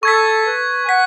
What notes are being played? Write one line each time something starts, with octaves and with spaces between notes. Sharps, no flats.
A4 C#6 G#6 B6
B4
G#5
F#5 B6